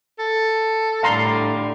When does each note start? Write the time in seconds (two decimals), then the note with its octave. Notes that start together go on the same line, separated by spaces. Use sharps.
0.19 A4
1.03 A2 D3 G3 F5 A#5 C6